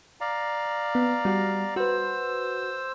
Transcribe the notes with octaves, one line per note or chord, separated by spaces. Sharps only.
D5 F5 A#5
B3
G3 F#4
F#4 B4 C5 E6